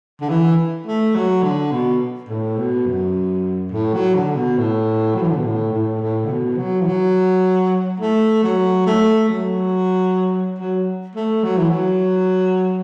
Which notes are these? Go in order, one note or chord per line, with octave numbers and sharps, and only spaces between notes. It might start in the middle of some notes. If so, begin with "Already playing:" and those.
D3
E3
A3
F#3
D3
B2
A2
B2
F#2
A2
F#3
D3
B2
A2
F#3
E3
D3
B2
A2
A2
A2
D3
B2
F#3
E3
F#3
A3
F#3
A3
F#3
F#3
A3
F#3
E3
F#3